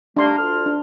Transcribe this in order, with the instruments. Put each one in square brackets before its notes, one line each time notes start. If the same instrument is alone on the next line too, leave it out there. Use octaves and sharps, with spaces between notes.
[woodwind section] G3 A3 A#3 [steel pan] D4 C6
[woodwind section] D2 F4 F6
[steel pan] D4